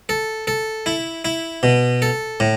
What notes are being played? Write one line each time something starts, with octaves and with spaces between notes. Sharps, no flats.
A4
A4
E4
E4
B2
A4
A2